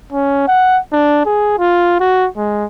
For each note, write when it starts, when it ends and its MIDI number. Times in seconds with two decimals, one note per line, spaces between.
0.13 0.45 61
0.48 0.78 78
0.93 1.21 62
1.26 1.58 68
1.59 1.98 65
2.00 2.28 66
2.37 2.65 56